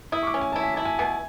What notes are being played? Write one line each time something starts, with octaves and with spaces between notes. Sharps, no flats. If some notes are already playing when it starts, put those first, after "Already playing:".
E4 D#6
C#6
D6
C#4
G#5
E4 A5
G#5
E4 A5
G#5
B2 G#5